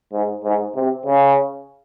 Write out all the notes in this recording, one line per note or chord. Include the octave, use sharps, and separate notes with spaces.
G#2
G#2
C3
C#3